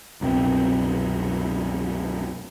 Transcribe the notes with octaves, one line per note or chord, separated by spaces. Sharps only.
C2 F#2 B2 C4